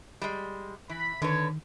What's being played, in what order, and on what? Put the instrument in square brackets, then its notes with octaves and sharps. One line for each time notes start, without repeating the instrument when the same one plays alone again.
[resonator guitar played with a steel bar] G3 G#3
[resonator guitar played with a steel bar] E3 [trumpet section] B5
[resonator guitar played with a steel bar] D3 B4 [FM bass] D#3 [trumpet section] C#5